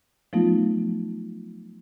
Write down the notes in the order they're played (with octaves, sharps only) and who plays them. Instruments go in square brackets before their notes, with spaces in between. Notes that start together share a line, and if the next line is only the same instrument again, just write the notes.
[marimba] F3 F#3 A3 B3 D#4 F4